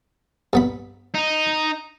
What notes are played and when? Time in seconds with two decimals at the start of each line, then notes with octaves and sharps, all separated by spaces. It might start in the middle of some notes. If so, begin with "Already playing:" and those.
0.53 G2 B3 B5
1.14 D#4